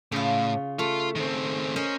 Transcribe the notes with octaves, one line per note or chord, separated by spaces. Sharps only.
A2 C#3 F4
A3 F4
D#3 C4
C#4 A#4 C5 D#5